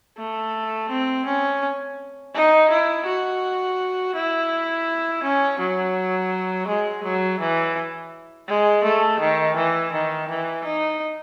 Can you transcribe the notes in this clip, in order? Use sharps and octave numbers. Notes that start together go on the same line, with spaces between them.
A3
C4
C#4
D#4
E4
F#4
E4
C#4
F#3
G#3
F#3
E3
G#3
A3
D#3
E3
D#3
E3
D#4